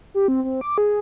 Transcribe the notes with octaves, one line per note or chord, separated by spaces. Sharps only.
G4
C4
C4
D6
G#4